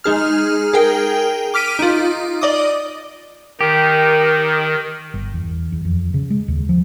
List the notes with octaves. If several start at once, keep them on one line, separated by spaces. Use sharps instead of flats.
G#3 D#4 G#4 F6
G#4 A#4 G5
D6 F6 B6 D7 D#7
D#4 F4
D5 D#5 D6 D#6
D#3 D#4 G4 A#4
G1
E2
E2
F2
C#3
G#3
D#2
F3